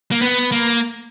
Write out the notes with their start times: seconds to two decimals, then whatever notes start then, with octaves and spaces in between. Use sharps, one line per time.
0.12 A#3
0.21 B3
0.52 A#3